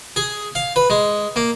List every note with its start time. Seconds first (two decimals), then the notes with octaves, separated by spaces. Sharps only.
0.16 G#4
0.55 F5
0.76 B4
0.90 G#3
1.36 A#3